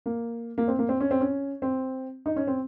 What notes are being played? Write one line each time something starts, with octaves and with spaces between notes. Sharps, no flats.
A#3
A#3
C4
A#3
C4
C#4
C4
C#4
C4
D#4
C#4
C4